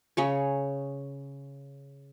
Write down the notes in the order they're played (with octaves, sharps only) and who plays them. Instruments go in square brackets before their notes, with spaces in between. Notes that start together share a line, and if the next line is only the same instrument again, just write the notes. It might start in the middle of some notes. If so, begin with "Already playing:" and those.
[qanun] C#3 G#4 C#5